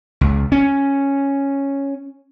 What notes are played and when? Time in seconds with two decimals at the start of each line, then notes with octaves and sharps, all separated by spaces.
0.21 C#2
0.52 C#4